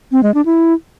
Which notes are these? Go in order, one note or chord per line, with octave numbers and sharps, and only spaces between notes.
C4
G#3
D4
E4